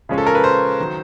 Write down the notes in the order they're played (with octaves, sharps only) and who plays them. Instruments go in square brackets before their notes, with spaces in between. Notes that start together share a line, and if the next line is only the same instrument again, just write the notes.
[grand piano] C#3 F3 G#3 C#4
A4
A#4
B4
C5
D#3 F#3